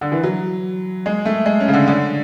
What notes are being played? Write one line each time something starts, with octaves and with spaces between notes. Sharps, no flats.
D3
E3
F#3
G#3
A3
G#3
C#4
C#3
D3
D3